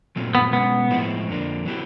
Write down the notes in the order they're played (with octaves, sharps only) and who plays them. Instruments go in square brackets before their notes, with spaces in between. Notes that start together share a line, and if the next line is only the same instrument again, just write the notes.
[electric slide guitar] A#2 F#3 A3 C4 F4
[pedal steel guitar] B3
[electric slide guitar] B2 G#3 C#4 [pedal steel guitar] B3
[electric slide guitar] A2 F3 G#3 C4 E4
F2 D3 F3 A#3 D4
F#3 B3 E4 G4